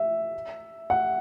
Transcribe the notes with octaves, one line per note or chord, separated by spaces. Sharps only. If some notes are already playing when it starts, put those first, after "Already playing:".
Already playing: E5
F#5